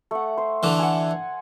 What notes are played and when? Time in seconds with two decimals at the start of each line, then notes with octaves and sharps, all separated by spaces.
0.11 A3 F#5
0.37 C5
0.63 D3 E3
0.79 F#5 G#5